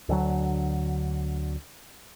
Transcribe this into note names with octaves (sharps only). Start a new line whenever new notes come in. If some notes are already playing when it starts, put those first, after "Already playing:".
D2 D3 D#3 F#3